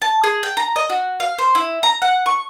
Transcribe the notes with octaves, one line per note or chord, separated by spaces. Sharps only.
A5
G#4
G5
A#5
D#5
F#4
F5
C5
E4
A#5
F#5
C#6